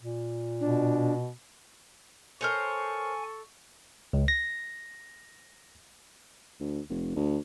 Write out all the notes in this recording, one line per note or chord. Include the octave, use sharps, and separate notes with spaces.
A#2
B2 D4
A4 A#4 C5 C#5 G#5 C#6
C#2
A#6
D2
F1
D2